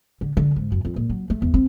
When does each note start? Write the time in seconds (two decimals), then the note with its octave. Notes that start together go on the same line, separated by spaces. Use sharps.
0.21 D3
0.37 D3
0.56 G#2
0.72 F#2
0.85 F2
0.96 A#2
1.10 F#3
1.30 A3
1.42 E2
1.54 C4